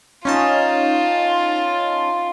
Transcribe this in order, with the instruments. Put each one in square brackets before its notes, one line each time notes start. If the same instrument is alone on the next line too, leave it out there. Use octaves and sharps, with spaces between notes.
[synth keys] C#4 D#4 A5 [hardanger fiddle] F4